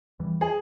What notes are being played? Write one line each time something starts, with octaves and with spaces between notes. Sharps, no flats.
E2 E3 G3
G#4